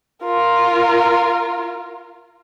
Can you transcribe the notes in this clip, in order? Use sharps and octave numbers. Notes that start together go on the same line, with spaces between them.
F4 A#4